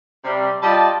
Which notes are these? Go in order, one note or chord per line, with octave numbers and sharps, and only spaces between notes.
C3 G3
G3 F4 D#5 A5